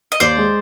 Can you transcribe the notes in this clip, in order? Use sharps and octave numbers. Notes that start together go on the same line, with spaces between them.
D#5
D#2 C5 D5
G#3